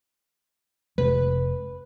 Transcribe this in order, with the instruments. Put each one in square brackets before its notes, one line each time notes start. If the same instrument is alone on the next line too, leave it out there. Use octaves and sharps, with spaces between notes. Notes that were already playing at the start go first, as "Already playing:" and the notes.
[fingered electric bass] F1 C3 G#3 [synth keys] B4